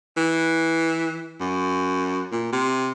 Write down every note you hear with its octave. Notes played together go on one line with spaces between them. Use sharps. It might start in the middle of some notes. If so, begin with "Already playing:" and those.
E3
F#2
A#2
C3